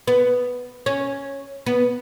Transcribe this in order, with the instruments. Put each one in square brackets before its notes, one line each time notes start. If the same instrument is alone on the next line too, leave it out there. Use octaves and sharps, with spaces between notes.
[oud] B3
C#4
B3